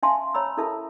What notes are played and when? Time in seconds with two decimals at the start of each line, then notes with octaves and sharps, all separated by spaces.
0.03 C#4 E5 F5 G#5 A5 C6
0.34 C#5 A#5 B5 E6
0.57 C#4 E4 A4 A#4 E5 A5